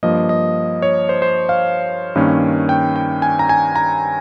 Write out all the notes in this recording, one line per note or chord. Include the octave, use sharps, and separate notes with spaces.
G2 F3 A#3 D#5
D#5
C#5
C5
C5
F5
G2 D#3 A#3 C#4
G5
G5
G#5
A#5
G#5
A#5